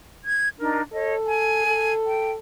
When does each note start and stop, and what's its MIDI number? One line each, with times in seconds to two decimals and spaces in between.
0.25 0.49 92
0.59 0.82 62
0.59 0.82 63
0.59 0.82 70
0.93 1.63 69
0.93 1.14 73
0.93 1.14 75
1.26 1.94 80
1.66 2.39 69
2.05 2.32 79